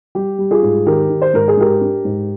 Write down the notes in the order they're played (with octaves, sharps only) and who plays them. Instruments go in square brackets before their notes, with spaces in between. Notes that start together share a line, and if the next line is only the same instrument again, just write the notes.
[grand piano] G3 G4
G3
F4 G#4
G#2
D#3 G4 A#4
D#3
C5
G#2 A#4
G#4
G#2 G4 A#4
D4
G#2